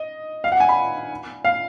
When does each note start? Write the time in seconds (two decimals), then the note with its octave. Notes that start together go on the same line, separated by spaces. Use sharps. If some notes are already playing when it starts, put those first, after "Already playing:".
Already playing: D#5
0.44 F5
0.52 F#5
0.60 G#5
0.69 B5
1.45 F5